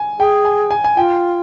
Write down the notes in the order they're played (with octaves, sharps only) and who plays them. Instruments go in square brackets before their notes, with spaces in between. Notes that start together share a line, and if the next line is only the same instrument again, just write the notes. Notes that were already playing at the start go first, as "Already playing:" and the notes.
Already playing: [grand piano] G#5
[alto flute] G#4 [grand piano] G5
[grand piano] G#5
G#5
G#5
[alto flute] F4 [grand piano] G5